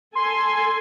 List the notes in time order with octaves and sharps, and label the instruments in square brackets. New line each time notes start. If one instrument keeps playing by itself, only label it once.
[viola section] A4 G#5 [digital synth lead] C6